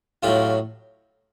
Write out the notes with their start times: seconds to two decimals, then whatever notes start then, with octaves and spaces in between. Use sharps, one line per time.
0.23 A2 F#3 F4 G4